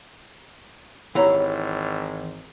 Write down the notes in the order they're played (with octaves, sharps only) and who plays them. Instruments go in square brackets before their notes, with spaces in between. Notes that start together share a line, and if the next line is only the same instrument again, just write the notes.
[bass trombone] G#1 [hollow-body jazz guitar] E3 E4 A#5 [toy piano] G4 C#5 F#5